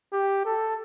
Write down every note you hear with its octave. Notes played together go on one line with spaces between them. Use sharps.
G4
A4